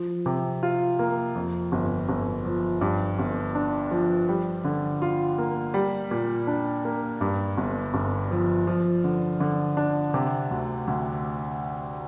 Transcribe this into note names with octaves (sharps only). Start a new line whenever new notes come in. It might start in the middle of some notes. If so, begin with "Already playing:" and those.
Already playing: F3
C3
F4
A#3
F2
G1
G1
F3
G2
G1
D4
F3
G3
D3
F4
A#3
G3
A#2
D4
A#3
G2
G1
G1
F3
F3
D3
D3
D4
C3
D2
D2